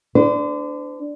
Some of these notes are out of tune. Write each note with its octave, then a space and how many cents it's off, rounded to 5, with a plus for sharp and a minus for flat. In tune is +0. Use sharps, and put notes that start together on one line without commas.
D4 +0 C5 -40